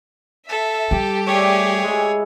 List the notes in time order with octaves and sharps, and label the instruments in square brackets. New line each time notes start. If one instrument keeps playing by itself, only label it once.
[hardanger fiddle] A4 [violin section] E5
[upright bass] G3 [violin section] G4
[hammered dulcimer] A3 D5 [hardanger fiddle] G#4 C#5
[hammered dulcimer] G#3 E4